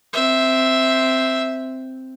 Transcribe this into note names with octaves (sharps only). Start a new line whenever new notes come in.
C4 E5